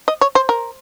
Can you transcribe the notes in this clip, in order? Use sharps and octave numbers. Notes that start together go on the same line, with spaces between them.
D#5
C#5
C5
A#4